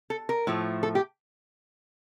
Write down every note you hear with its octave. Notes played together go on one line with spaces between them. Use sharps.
A4
A#4
A2 F3 A3
A4
G4